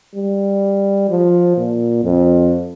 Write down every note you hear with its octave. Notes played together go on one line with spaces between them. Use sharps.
G3
F3
A#2
F2